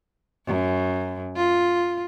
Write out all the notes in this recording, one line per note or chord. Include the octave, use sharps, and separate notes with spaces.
F#2
F4